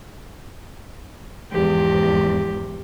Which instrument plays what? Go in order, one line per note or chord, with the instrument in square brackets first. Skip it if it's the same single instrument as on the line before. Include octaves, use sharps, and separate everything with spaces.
[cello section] E2 G#2 F3 [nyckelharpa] G4